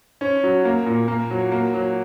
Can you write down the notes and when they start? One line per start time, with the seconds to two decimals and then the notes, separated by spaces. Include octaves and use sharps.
0.21 C#4
0.44 F#3
0.65 A#3
0.86 A#2
1.08 A#3
1.30 F#3
1.52 A#3
1.74 F#3